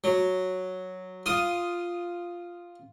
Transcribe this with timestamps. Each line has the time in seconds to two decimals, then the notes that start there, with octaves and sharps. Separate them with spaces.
0.04 F#3
1.26 F4 D#6